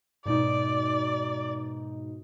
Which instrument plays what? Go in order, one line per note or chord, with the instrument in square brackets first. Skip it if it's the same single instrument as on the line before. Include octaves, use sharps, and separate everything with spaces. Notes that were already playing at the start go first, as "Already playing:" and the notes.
[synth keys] G#2 B2 D#4 [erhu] D5